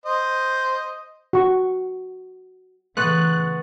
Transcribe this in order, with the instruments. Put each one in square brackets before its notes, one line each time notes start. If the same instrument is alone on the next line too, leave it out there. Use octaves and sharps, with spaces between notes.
[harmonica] C5 D#5
[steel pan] F#4 C#6
[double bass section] C#3 E3 [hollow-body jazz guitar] A3 B3 [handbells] C6 C#6 A6 [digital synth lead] F#6